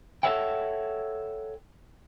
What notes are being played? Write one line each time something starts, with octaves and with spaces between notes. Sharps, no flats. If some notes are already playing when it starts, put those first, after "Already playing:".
A4 C#5 E5 F#5 G5